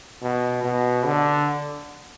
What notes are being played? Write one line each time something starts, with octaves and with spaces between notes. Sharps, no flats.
B2
B2
D3